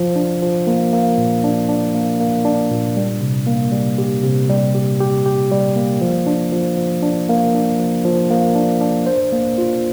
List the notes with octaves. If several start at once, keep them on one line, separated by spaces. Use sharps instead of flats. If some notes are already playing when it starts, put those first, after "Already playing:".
Already playing: F3
D4
F3
A#3
A#3
A#2
D4
D4
A#3
A#3
D4
A#2
G3
C3
A#3
G3
G4
C3
G3
G4
G4
G4
G3
A#3
F3
D4
F3
F3
D4
A#3
D4
F3
F3
A#3
D4
D4
C5
A#3
F4